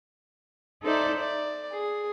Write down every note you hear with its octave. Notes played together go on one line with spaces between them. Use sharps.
D#4 A4 C5 D5 E5
D5
G#4